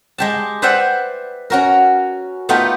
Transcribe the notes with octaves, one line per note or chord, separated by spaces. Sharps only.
G#3 G4 A5
B4 C5 D5 E5 F#5 G5
C#4 F#4 A#4
A3 B3 D#4 F4 G4